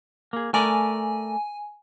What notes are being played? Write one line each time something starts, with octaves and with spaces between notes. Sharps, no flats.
A#3 G#4
A3 A#4 D5 G#5